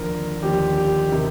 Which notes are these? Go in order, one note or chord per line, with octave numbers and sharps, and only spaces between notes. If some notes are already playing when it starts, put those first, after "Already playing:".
Already playing: D#2 D3 F3 A#4
D#2 D3 F3 G4
G4
C3 D#3